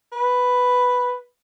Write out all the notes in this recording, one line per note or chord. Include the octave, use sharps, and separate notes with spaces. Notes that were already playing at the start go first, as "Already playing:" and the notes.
B4